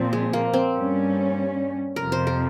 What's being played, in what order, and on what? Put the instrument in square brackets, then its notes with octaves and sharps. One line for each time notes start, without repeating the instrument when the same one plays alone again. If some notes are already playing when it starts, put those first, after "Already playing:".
Already playing: [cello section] A#2 F3 C4
[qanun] G#3
A#3
C4
[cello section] G2 G3 C#4
[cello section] F2 C3 F3 [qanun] A#4
[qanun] C5
A#4